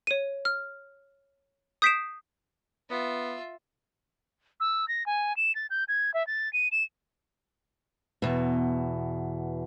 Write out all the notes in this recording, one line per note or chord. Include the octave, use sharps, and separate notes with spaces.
C#5 D#7
F6
D#6 G6 B6 C7 D7 E7
B3 F4 E5
E6
A#6
G#5
E7
A6
G6
G#6
E5
A6
D#7
E7
E2 B2